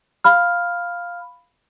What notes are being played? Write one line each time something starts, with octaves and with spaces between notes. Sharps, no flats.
F5 B5 F6